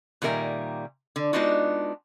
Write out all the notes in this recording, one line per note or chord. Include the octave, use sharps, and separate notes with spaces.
A#2 D#3 G3 A#4 E5 G#5
D3
G#3 B3 D4 D#4 F4 F#4